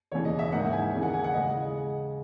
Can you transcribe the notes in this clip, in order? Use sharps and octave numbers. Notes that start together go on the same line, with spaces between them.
E1 D#2 C#3 E3 C#5
D#5
E5
G#2 D#3 A#3 D#4 F#5
G#5
D#2 C#3 E3
F#5
G#5
F#5
D#5
C#3 G#3